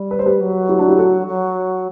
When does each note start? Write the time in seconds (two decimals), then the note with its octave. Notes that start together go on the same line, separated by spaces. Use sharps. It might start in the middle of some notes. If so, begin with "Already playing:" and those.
Already playing: G3
0.11 B4
0.19 C5
0.26 G4 B4
0.40 F#3
0.68 E4 G4
0.78 D4 F#4
0.88 E4 G4
0.98 F#4 A4
1.27 F#3